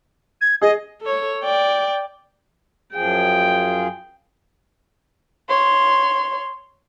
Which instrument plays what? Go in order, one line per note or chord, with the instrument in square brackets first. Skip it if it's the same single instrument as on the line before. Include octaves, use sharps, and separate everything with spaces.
[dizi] G#6
[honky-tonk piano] G#4 [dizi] D#5
[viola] A4 C#5
D5 G5
[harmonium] F#2 F3 G#4 [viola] G5
[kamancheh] C#5 C6